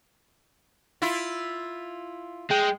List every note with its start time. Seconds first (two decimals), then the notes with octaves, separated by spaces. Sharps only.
1.02 E4 F4
2.51 G#3 G5